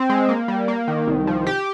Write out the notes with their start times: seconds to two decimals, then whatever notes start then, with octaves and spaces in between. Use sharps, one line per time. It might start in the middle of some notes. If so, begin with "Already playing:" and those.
Already playing: C4
0.10 G#3
0.29 A#3
0.48 G3
0.68 A#3
0.88 D#3
1.07 C2
1.27 F3
1.47 G4